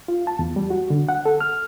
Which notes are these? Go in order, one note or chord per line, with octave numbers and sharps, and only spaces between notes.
F4
A5
E2
G3
F#4
D3
F#5
A4
F6